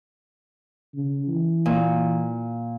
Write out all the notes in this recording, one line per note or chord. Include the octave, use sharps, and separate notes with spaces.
C#3
E3
A#2